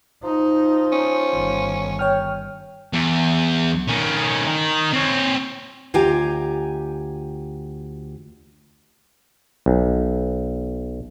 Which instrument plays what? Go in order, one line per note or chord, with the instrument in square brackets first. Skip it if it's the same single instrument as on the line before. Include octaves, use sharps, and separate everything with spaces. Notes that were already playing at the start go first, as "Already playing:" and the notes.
[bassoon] F3 [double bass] D#4
[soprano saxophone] C#4
[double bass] G1 D#3
[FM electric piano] C#5 G5 F6
[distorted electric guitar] E2
D#3 C#4
D#3
C4 C#5
[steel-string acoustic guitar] D2 F4 G4 G5 G#5 A#5
[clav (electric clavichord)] B1